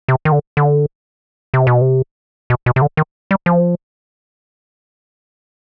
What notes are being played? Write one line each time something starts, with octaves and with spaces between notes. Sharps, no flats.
C3
D#3
D3
D3
C3
B2
C3
B2
B2
C3
D3
D#3
G3
F3